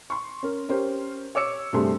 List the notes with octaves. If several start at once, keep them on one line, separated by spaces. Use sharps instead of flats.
C6 C#6
C#4 A#4
C#4 G4 A#4 C5
C#5 D6 E6 C#7
G2 C3 A3 D4 G#4 C6